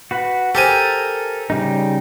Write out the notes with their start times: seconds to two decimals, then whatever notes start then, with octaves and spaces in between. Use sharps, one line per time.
0.11 F#4 B4
0.55 G4 A4 A#4 C5 G#5
1.50 C#3 G3 D#4